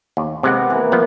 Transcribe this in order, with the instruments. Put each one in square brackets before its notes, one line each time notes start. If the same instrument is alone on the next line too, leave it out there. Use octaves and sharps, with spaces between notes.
[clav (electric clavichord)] D#2
[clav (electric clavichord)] C3 G#3 F#5 [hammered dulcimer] B3 G4
[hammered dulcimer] E3 A#3
[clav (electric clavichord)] F3 B3 F#5